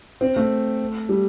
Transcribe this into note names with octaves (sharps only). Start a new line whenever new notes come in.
C4
A3
G3